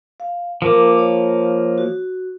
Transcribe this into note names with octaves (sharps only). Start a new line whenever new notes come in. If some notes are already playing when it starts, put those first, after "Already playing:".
F5
F3 A#3 A#4 D6
C#5
F#4